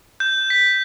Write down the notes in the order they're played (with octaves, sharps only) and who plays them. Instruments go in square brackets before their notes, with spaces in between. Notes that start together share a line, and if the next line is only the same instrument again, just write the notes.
[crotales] G6
B6